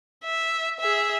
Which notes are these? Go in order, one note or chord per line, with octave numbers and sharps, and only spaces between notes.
E5
G#4 E5